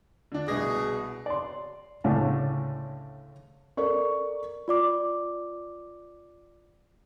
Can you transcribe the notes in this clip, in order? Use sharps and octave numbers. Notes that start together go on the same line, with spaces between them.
D3 D4
C2 B2 G#4 A#6
D5 C6
C#2 A2 D3 C#4 D4
A4 A#4 D5 C#6
F4 D5 D6